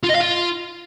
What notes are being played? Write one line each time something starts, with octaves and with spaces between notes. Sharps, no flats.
F4
D#5
F5
F4